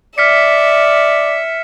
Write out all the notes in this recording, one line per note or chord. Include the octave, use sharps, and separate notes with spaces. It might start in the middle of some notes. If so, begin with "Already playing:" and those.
D5 E5 F6 B6 C#7